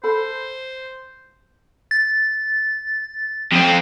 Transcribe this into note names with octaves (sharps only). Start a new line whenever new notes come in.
A4 C5 B5
A6
F2 C4